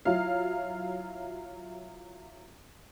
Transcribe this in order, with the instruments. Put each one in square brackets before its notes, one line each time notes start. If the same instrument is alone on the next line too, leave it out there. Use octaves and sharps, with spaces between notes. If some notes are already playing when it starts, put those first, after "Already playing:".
[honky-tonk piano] F#3 E4 F4 F5